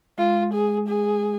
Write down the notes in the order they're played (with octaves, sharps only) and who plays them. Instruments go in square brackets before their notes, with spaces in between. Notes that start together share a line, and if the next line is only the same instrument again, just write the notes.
[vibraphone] G#3 [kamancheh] F4
[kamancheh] G#4
G#4